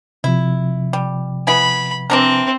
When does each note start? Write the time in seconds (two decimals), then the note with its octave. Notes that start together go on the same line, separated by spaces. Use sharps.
0.24 C3 F3 E4
0.93 G3
1.47 B3 E4 G#5 B5
2.10 E3 C4 D4 A#4